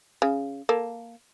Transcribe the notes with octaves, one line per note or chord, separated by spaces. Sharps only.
C#3
A#3 A4